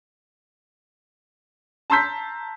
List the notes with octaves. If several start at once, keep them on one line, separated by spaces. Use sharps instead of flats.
A5 A#5 C6 E6 G6 B6